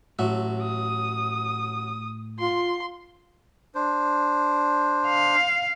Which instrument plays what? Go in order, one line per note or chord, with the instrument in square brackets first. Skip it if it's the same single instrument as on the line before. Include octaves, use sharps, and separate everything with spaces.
[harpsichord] A1 F#3 E5 [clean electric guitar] A2
[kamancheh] D#6
[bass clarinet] F4 [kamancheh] C6
[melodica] D4 C5
[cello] F5